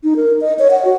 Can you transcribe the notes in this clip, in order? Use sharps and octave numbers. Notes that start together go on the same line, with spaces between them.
D#4
A#4
D#5
C#5
F#5
F#4